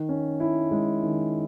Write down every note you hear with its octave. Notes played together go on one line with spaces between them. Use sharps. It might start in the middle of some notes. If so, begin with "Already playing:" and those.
Already playing: D#3
C#4
E4
G#3
D#3